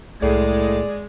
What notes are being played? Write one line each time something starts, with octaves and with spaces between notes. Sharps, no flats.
C2 A2 G#3 D5